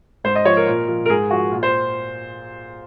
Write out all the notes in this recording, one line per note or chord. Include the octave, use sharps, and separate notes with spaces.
G#2 C5
D#5
F3 C#5
A#4
A#2
F3
A#4
G#2 G#4
F3 F#4
A#2
C5